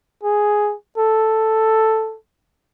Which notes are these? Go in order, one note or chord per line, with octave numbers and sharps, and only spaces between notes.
G#4
A4